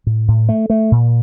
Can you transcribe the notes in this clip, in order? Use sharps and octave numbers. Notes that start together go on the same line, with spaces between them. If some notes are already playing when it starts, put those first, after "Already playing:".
A2
A2
A3
A3
A#2